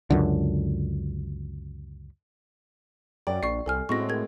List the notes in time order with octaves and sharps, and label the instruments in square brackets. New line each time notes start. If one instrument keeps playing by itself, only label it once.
[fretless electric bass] C#2 F#2 D3
[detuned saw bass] F#2 [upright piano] D5 [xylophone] G5
[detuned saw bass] A#1 [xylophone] D5 C#6 [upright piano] C7
[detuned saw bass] C2 [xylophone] A4 G#5 F6
[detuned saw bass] A2 [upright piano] G#3 C4 F#4 [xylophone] C#6 A#6
[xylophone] G#4 A#4 G#6